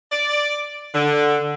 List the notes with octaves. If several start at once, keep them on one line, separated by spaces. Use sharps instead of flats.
D5
D3